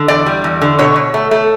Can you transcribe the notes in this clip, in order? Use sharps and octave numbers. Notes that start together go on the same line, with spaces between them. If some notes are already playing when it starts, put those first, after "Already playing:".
Already playing: D3
E2 D5
G3
E2
D3
B2 C#5
B2
A3
A3